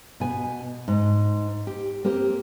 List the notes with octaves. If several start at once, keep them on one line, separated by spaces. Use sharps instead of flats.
B2 G#5
G#2
G4
A#3 C4 G4 A#4